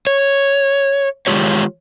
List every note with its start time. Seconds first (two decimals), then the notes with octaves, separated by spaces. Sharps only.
0.07 C#5
1.27 D#3 G#3 A#3 F4 G4 C#5